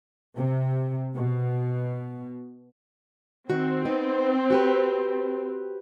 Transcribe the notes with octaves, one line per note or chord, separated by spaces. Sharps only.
C3
B2
D#3 C4 F#4
B3 D#4
F#4 G4 B4